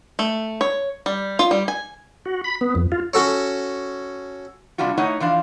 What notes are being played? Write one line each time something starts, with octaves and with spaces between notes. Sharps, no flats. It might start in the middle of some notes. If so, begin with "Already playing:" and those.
A3
C#5
G3
F4
G3
G#5
F#4
B5
B3
F2
F4
C#4 F#4 A4 C#5
C3 G3 D4 F4 F#4
A3 D#4 E4 C#5 D#5 F#5
E3 F3 D4 F5